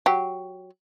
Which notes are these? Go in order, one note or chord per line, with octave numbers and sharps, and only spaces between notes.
F#3 G4